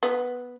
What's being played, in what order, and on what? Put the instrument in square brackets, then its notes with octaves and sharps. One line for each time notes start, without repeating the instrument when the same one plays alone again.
[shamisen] B3